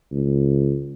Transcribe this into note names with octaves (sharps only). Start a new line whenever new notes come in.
C#2